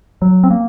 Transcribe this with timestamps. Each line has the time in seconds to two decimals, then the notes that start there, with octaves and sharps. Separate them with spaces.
0.22 F#3
0.44 C4
0.51 A#3